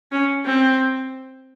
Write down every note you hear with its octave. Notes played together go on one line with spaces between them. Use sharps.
C#4
C4